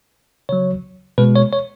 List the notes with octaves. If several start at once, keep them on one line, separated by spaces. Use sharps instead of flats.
C#3 F#3 C#5
B2 G#3 B4
C#5
C#5